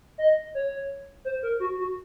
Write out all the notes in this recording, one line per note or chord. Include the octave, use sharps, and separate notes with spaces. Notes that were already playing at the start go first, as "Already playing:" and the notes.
D#5
C#5
C5
A#4
F#4
F#4